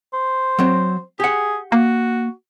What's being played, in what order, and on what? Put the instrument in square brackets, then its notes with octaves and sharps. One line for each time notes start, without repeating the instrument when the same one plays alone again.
[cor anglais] C5
[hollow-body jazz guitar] F#3 C4
[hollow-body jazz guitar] G4 F#5 [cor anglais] G#4
[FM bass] A#3 [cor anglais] F#4